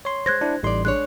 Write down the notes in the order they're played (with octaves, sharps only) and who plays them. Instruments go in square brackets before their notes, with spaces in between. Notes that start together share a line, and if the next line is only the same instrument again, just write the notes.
[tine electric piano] C#5 C6
[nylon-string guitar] G#3 C5 [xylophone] F#6 G#6 A#6
[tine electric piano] D4 E4
[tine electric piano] A1 G3 C6 [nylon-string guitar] D#4 D5
[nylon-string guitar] G#3 D4 C#5 [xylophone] F#6